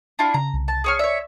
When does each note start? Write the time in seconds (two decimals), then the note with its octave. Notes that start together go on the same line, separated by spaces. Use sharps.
0.19 D4 E4 F4
0.34 C#3 A#5
0.53 C2
0.68 A5
0.84 G#4 C#5 F6
0.99 C#5 D5 E5